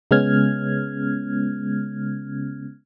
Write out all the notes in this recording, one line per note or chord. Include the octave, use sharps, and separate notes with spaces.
C#3 G#3 B3 C#4 F6 G#6